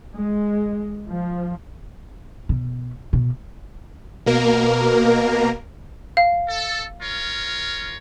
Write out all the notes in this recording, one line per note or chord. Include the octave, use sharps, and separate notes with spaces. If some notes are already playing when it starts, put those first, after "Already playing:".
G#3
F3
B2
B2
B2 A#3 A#4
F5
A4
F4 A#4 C#5